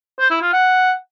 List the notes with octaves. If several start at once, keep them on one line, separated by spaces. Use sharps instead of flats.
C5
E4
F4
F#5